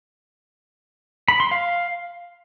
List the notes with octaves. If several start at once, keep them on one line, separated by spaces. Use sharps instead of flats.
B5
C6
F5